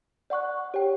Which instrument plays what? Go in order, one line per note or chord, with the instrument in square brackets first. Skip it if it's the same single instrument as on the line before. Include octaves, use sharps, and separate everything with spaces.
[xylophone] D5 F#5 C#6 F#6
G4 C#5 G5